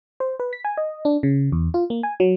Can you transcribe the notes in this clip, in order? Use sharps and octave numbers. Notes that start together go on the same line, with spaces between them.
C5
B4
B6
G#5
D#5
D4
C#3
E2
F4
A#3
G#5
F#3